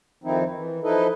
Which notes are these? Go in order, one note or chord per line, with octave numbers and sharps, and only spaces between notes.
F2 D#3 F3 C4 D#4 E4
E3
F3 D#4 E4 A4 B4 D#5